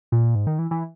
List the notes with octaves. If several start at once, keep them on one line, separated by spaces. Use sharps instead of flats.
A#2
G#2
D#3
E3
E3